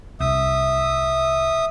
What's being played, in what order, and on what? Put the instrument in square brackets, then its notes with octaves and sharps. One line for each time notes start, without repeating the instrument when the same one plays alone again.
[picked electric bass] C2 [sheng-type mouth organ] E5 D#6